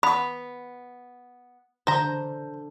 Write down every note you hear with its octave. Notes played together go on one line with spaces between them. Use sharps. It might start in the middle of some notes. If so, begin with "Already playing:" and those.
B3 B5
D3 C5 A#5